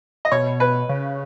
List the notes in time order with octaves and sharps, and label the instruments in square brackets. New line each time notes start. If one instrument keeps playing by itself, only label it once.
[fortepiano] D#5
[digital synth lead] B2 [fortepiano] C#5
[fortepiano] B4
[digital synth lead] C#3